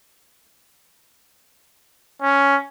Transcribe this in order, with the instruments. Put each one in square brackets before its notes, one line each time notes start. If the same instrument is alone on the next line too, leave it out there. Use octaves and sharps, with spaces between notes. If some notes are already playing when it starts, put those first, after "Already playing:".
[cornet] C#4